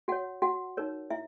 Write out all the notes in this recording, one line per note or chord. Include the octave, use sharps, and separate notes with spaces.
F#4 C#5 F#5
F#4 F#5
D#4 A#4 C#5
E4 E5